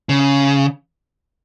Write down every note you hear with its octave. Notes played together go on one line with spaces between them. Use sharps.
C#3